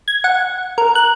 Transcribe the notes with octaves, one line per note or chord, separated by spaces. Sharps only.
G#6
F#5
A#4
F#6